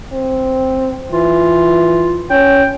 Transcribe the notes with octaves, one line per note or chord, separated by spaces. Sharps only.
C4
E3 F4
C#4 G5